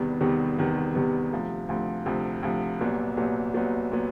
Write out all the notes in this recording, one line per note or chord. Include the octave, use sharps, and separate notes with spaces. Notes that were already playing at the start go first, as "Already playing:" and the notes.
Already playing: E2 C3 D#3 G3 B3
E2 C3 D#3 G3 B3
E2 C3 D#3 G3 B3
E2 C3 D#3 G3 B3
D2 C3 F3
D2 C3 F3
D2 C3 F3
D2 C3 F3
C2 A#2 F#3 B3
C2 A#2 F#3 B3
C2 A#2 F#3 B3
A#2 F#3 B3